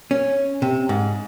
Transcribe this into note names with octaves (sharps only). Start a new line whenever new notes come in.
C#4
C3
G#2